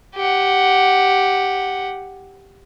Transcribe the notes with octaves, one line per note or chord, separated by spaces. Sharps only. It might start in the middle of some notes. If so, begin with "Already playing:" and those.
G4 F#5